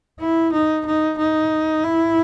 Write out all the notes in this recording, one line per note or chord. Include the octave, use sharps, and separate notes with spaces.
E4
D#4
D#4
D#4
E4